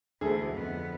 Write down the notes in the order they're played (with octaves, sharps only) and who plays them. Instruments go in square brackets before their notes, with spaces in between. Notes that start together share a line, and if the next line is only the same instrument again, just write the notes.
[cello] D2 E3 [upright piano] D3 [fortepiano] G#4 A4
[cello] F2 B3